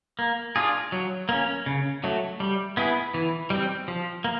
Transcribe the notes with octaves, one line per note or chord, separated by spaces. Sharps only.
A#3
D4 F4 G#4
F#3
A#3 C#4
C#3
F#3 A3
G3
B3 E4 G#4
E3
G3 C4
F3
A#3